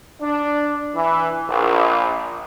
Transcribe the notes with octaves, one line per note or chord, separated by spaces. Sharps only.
D4
E3
A#1